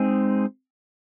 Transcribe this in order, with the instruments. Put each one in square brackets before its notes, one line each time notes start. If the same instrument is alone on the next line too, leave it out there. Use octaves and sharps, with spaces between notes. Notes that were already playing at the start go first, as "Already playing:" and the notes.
Already playing: [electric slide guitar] G#3 C4 D#4 G#4